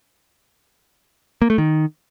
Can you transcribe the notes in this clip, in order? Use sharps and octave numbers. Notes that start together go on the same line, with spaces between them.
A#3
A3
D#3